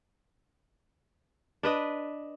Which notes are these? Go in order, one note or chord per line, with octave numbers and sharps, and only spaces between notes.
D4 B4 D#5